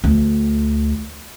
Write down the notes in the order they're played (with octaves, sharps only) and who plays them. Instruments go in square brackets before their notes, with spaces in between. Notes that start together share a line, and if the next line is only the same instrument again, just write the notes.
[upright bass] D2